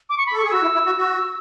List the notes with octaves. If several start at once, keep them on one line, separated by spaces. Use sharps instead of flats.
D6
C#6
B5
A4
G#4 C#6
F#4 E6
E4
E4
F#4
F#4